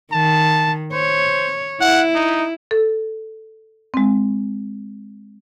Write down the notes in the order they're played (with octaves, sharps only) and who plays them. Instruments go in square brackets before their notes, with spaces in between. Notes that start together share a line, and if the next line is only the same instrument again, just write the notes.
[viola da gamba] D#3 [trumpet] A5
[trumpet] C5 [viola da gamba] C#5
[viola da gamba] E4 [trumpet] F#5
[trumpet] D#4
[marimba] A4
G#3 C4